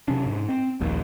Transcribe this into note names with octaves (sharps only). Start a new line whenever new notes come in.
C3 F#3 C#4 D4
G#2
C4
D#1 A#1 D#2